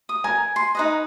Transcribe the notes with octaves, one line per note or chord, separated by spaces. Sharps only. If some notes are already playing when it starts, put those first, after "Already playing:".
D#6
A#4 G#5
C6
D#4 B4 D#5